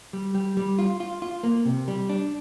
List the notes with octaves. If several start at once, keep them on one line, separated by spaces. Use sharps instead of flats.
G3
G3
G3
F4
F4
F4
A#3
C3
G3
D4